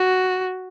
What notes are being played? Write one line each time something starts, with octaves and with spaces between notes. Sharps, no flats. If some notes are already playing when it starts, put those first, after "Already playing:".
Already playing: F#4